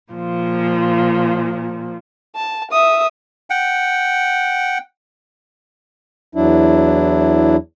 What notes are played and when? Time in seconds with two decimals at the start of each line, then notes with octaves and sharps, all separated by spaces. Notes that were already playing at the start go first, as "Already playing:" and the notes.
0.10 A#2 F3
2.36 A5
2.72 E5 D#6
3.50 F#5 G5
6.35 E2 F#3 D4 E4